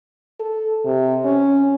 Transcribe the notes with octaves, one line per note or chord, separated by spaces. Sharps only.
A4
C3
C#4